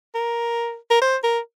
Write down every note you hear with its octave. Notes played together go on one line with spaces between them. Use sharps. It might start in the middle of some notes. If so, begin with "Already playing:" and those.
A#4
A#4
C5
A#4